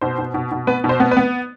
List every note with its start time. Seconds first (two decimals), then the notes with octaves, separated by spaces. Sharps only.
0.01 B2 C5
0.18 B2
0.34 B2
0.51 B2
0.67 B3 B4
0.84 B2
0.89 C5
1.00 B3
1.11 B4
1.17 B3